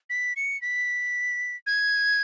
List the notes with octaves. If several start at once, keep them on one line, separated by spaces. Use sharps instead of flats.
B6
C#7
B6
G#6